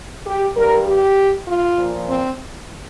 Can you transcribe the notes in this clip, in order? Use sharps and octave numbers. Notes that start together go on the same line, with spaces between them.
G4
G2 G3 A#4
G4
F4
A#2 F3
C4